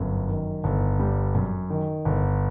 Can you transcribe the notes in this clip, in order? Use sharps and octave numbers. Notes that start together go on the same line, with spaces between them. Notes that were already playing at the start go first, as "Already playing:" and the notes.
Already playing: G1 F#2
D#3
G1
G3
F#2
D#3
G1